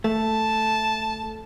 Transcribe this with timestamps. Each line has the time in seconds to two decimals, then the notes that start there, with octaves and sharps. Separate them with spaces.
0.04 A3 A5